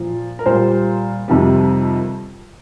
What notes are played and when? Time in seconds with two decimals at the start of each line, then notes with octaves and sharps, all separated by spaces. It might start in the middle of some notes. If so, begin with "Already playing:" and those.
Already playing: A#2 F3
0.39 A#4
0.46 A#2 G3 C5
1.28 F2 C3 D#3 G3